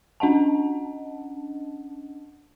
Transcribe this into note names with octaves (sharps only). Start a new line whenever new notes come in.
C#4 D4 D#5 F#5 A5